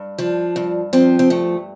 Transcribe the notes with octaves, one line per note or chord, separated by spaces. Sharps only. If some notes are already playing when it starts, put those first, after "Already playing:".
Already playing: G2
F3 D4
G2
F3 C4
C4
G2 A3